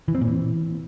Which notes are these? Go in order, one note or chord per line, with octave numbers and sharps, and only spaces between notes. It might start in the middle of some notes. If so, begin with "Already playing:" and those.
E3
C4
A#2
E3